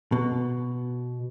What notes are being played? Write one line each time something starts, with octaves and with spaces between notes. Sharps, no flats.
B2